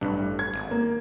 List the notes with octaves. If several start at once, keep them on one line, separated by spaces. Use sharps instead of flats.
A1 G2
G#6
G#1
A#3